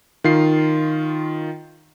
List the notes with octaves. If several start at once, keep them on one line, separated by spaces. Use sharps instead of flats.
D#3 F4 C7